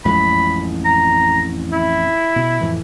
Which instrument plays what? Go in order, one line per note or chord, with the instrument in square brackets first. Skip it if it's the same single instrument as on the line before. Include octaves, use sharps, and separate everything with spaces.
[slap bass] A1 F2 G#3 [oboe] B5
[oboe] A#5
E4
[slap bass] B2
F2 A2 E3